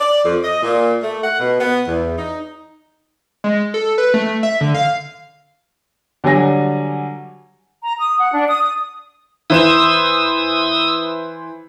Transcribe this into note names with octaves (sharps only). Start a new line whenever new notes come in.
D5
F2
D#5
A#2
A3
F#5
B2
B3
E2
D#4
G#3
A4
B4
A3
A3
E5
D3
F5
D3 F#3 G3 G#5 A#6
A#5
D#6
F#5
D4
D#6
D#6
E3 C5 D#6 E6 E7